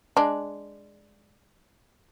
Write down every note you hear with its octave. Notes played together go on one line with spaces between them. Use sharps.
G#3 D4